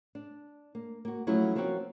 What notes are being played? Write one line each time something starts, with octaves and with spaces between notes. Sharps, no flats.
D4
A#3
A#3 F#4
F3 F#3 A3 C#4 E4 F4
F3 A#3 C4 C#4 F#4